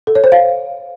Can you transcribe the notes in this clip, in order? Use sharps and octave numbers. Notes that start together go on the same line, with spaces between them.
A4
C#5
C5
F5